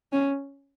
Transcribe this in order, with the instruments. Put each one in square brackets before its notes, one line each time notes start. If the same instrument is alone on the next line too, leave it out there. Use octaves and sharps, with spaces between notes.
[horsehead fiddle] C#4